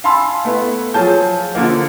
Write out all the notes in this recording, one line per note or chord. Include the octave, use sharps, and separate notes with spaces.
F5 G#5 A5 B5 C6 E6
A3 B3 E4
F3 F#3 F4 G#4 A5 G6
D3 F3 A#3